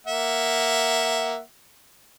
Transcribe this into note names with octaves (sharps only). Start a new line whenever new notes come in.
A#3 E5 F#5